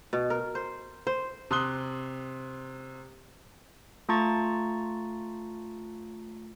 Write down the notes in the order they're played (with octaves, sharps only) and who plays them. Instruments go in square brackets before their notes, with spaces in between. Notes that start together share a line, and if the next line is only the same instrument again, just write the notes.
[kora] B2
A#4
C5
C5
[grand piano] C3 C6 D#6 F#6 G7
[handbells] A3 F4 A5 A#5 C#6 A6